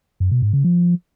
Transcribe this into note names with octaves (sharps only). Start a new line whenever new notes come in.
F#2
B2
G#2
C#3
F3